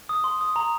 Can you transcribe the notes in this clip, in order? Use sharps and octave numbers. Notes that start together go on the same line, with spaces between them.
D#6
C6
D#6
A#5